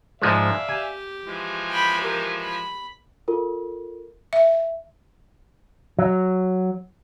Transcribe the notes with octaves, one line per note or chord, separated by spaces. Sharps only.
G#2 F3 G#3 D5 E5 F5
G4 G#5
E3 F3 G#3
G5 B5
G4 A#4
B5
F4 A4 A#4
E5
F#3